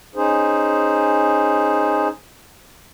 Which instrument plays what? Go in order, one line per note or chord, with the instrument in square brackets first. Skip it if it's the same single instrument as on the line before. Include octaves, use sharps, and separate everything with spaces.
[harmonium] C#4 D#4 G#4 C5